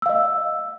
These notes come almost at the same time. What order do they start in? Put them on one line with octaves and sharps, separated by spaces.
E6 F5 D#5